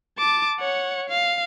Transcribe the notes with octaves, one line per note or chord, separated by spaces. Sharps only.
A5 D6
C#5 F#5
F5